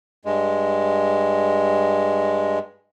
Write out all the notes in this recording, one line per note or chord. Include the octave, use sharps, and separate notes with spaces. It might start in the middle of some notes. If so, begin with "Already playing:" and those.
G2 G#3